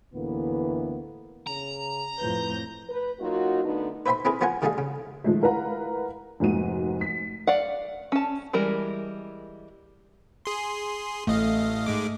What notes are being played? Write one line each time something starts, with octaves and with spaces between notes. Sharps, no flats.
D2 A2 E3 A#3 B3
C#3 A#5
F2 A2 B4 G6
B4
F#3 A#3 D#4 F4 F#4
D3 A3 B3 D#4
B4 C5 E5 G5 B5 C6
C4 E4 G#4 A#4 B4
F3 B3 F4 A#4 F#5 G#5
D#3 G3 A3 D#4 G#4 F5
C#3
D#3 F3 G#3 A3
E4 A#4 B4 F5 F#5 A#5
F1 G#2 A#3 F#4 D#7
B6
D5 F5 F#5
C#4 A5
E3 G3 G#3 A#4
G#4 C6
A1 A3 D#5 F5
G#2 G#3 D6